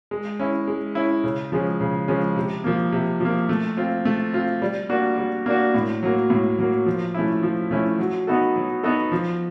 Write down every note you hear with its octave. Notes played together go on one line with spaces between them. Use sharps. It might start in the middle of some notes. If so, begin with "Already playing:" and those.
G#3
C#4 E4
G#3
C#4 E4
C#3
F3 G#3 C#4
C#3
F3 G#3 C#4
C3
F3 A#3
C3
F3 A#3
A3
C4 F4
A3
C4 F4
G3
A#3 D4 F#4
G3
A#3 D4 F#4
A2
F#3 A#3
A2
F#3 A#3
F3
A3 C#4 E4
F3
A3 C#4 E4
F#3
B3 D#4 F#4 A4
F#3
B3 D#4 F#4 A4
F3